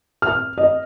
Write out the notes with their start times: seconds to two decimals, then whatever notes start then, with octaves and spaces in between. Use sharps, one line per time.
0.22 F6
0.58 D#5